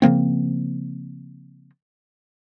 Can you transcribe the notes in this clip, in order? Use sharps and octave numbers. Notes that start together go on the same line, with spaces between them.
C#3 F3 A#3 C4